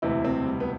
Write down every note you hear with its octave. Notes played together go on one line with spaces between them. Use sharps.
E1 D2 C3 E3 E4
C4
G3
B3